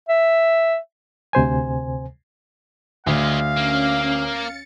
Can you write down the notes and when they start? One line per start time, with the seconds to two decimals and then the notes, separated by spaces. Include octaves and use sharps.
0.09 E5
1.33 D2 C3 C5 G#5
3.07 D2 G#3 F4 F5
3.56 A#3 C#4
4.26 A6 C#7